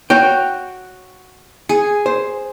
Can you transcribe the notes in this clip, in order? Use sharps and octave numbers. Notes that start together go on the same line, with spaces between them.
F#4 C#5 G5
G#4
C5